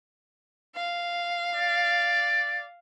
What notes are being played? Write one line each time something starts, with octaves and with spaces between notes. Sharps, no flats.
F5
D5